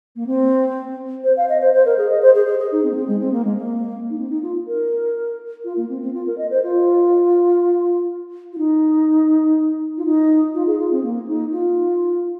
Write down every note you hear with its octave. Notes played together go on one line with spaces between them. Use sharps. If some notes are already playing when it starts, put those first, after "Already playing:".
A#3
C4
C5
F5
D#5
C5
C5
A#4
G#4
D#5
C5
G#4
G#4
G#4
D#4
C4
A#3
C4
G#3
C4
A#3
G#3
A#3
D#4
C4
D#4
F4
A#4
F4
A#3
C4
C4
F4
A#4
D#5
C5
F4
F4
D#4
F4
D#4
F4
G#4
F4
C4
A#3
D#4
F4